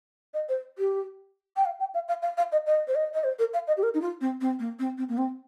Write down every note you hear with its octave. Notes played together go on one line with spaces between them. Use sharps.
D#5
C5
G4
G5
F5
G5
F5
F5
F5
F5
D#5
D#5
C5
D#5
D#5
C5
A#4
F5
D#5
G4
A#4
D#4
F4
C4
C4
A#3
C4
C4
A#3
C4